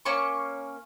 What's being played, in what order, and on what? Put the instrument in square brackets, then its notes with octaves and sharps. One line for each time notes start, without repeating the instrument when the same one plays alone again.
[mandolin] A#3 C#4 C#6